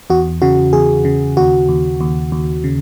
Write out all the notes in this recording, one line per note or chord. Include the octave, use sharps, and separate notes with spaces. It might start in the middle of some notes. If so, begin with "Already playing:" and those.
E2 F#4
C#3 F#4
E2 G#4
C#3
D#2 F#4
D#2
D#2
D#2
C#3